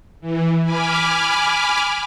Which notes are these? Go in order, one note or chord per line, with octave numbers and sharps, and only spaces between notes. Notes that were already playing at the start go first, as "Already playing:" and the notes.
E3
G#5 B5 D6 F6